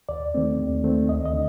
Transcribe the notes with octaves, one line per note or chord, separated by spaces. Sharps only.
D#2 D5
D#3 A3 C4
D#2
D#3 A3 C4
D2 D#5
D#5
D3